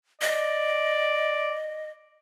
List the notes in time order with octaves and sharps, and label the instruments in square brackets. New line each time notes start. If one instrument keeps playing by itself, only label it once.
[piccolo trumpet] D5 [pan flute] D#5